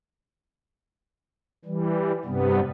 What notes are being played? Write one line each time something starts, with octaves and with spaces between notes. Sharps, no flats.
E3 G3
G2 C3 G3 B3